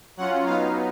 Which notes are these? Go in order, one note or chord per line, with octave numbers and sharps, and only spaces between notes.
F#3 C#4 F4 F#5
F#3 B3 D#4 F5